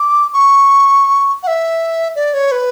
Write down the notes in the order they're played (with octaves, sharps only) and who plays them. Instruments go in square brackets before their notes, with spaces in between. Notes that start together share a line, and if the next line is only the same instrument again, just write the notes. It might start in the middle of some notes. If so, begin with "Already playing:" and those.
Already playing: [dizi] D6
C#6
F#5
E5
D5
C#5
B4